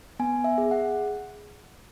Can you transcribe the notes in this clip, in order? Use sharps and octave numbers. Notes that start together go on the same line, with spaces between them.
B3 G#5
E5
G#4
F#5